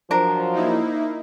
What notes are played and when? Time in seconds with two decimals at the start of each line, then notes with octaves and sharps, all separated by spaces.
0.11 F3 F#3 D4 A#4
0.53 A#3 D#4 E4